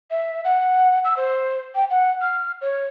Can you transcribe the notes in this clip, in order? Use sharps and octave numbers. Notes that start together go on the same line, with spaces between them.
E5
F#5
E6
C5
G5
F#5
F6
C#5